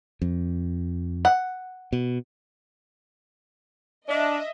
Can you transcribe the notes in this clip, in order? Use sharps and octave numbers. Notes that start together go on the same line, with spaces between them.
F2
F#5
B2
D4 D#5 E5